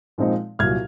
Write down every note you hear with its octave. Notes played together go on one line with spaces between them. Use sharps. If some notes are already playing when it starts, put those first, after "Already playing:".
A#2 F3 G#3 C4 D#4
C2 A#2 F#3 F6 G#6